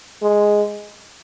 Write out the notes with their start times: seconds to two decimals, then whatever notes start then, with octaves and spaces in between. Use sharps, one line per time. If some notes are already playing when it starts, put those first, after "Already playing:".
0.22 G#3